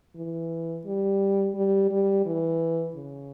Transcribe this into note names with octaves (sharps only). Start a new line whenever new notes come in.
E3
G3
G3
G3
E3
C#3